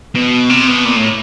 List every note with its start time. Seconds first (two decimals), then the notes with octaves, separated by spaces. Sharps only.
0.15 B2
0.50 C3
0.68 B2
0.85 A#2
0.97 A2